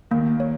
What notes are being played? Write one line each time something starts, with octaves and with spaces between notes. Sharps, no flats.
D#2 D#3 A#3
C#5